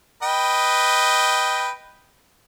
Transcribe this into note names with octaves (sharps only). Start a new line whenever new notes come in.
B4 D#5 G5